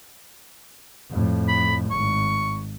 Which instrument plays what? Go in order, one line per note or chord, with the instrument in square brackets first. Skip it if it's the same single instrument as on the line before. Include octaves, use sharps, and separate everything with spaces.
[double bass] F2 A2
[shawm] B5
[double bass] G#1 [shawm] C#6